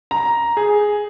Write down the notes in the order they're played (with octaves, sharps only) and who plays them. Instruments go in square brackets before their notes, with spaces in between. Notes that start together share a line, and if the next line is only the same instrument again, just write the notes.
[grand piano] A#5
G#4